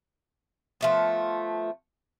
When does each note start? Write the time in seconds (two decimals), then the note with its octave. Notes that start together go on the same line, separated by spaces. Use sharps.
0.81 F3 A3 B3